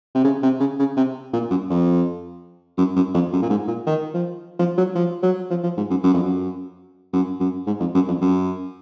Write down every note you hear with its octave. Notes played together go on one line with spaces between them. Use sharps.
C3
C#3
C3
C#3
C#3
C3
A#2
F#2
F2
F#2
F#2
F2
F#2
A#2
G#2
A#2
D#3
F3
F3
F#3
F3
F#3
F3
F3
G#2
F#2
F#2
F2
F#2
F#2
F#2
G#2
F2
F#2
F2
F#2